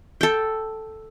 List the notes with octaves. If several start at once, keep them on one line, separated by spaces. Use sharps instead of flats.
A4 G5